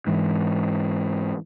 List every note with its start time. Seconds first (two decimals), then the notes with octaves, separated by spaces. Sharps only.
0.07 G#2 E3